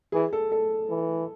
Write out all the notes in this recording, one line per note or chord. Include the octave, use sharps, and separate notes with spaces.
E3 G#4
A4
A4
E3